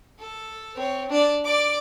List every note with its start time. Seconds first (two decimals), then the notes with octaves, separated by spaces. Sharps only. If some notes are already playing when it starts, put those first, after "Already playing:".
0.20 A4
0.75 C4 C#5
1.09 D4 D5
1.45 D5 D6